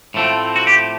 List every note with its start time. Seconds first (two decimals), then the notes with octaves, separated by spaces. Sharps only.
0.14 A2 F3 A3 C4
0.56 F#4
0.67 G4